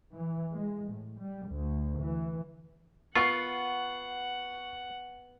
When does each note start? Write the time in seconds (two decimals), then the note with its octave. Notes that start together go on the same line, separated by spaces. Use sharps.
0.13 E3
0.53 G#3
0.91 A2
1.19 G3
1.48 D2
2.01 E3
3.15 B3 F4 F#5 C#6 C7